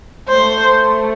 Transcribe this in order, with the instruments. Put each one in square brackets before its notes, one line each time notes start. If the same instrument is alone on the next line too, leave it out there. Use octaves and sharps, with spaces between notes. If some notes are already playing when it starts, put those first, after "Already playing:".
[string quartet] A3 [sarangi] C5